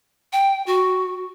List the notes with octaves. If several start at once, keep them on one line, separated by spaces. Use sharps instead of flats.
G5
F#4